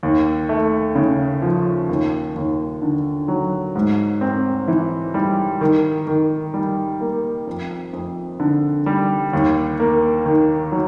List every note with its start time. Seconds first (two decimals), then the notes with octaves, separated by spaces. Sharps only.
0.03 D#2
0.49 A3
0.95 C#3
1.42 F3
1.89 D#2
2.36 D#2
2.82 D3
3.28 F#3
3.75 G#2
4.21 C4
4.68 E3
5.14 G3
5.61 D#3
6.07 D#3
6.54 G3
7.01 A#3
7.47 F2
7.93 F2
8.40 D3
8.86 G3
9.33 D#2
9.80 A#3
10.26 D#3
10.72 F#3